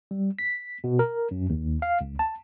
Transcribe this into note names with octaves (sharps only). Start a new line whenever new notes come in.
G3
B6
B2
A#4
F#2
D#2
F5
C#2
A5